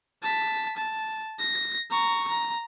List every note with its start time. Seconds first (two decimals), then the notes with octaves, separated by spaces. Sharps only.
0.23 A5 B6
0.77 A5
1.39 A#6
1.91 A#5 C#6
2.28 A#5